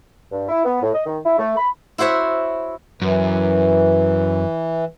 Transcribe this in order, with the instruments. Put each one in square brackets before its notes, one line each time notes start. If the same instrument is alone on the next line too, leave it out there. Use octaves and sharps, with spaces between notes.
[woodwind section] G2
E4
B3
A2
D#5
D#3
E4
A3
B5
[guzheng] E4 F#4 C5 C#5 E5
[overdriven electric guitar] F#2 [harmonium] E3